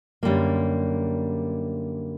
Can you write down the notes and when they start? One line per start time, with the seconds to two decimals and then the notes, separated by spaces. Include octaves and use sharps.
0.23 F#2 D3 G3 A#3